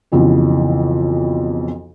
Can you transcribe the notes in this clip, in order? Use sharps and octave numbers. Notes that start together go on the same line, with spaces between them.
B1 F2 C#3 E3